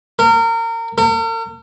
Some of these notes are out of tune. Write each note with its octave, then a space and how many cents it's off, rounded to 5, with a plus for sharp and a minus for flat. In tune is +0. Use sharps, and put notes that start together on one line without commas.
A#4 -30
A#4 -45